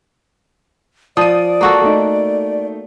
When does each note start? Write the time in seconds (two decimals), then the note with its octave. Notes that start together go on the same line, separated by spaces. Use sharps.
1.17 F3 D5 D#6 D#7
1.61 A#3 F#4 A4
1.81 A3 D#4